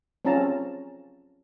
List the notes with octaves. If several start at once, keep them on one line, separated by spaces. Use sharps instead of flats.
C4 C#4 F4 A5 A#5